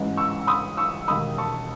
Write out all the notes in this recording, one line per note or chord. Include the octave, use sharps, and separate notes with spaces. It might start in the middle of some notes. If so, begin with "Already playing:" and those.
Already playing: A1 G#2 E3 G#3
C#6 E6
B5 D#6
C#6 E6
E1 D#2 D#3 G#3 B5 D#6
A5 C#6